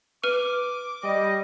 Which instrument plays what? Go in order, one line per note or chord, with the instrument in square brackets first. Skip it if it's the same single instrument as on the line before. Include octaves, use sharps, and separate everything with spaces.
[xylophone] B4 F6 D#7 [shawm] D6
[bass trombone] G3 [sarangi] D#5